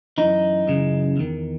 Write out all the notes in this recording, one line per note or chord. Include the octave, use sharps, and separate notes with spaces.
F#2 E3 D#4
F#2 C#3 E3
E2 D#3